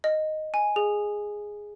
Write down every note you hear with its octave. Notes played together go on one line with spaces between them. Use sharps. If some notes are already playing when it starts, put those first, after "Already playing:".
D#5
G#5
G#4